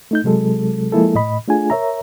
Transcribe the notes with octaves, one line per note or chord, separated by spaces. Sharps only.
A3 D#4 G6
C3 F#3 G#3 A4
F3 G#3 A#3 E4 G#4 A4
A2 D#5 B5
A3 D4 F4 G#4 G#5
A#4 C#5 E5 A#5